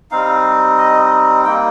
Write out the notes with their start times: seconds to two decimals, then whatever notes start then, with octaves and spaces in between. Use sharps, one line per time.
0.11 G3 C4 D#4 F5
0.78 D#5
1.45 G3 A#3 D#4 G5